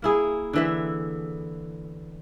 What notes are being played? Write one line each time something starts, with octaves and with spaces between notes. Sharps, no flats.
A#3 E4 G#4
D3 E3 E5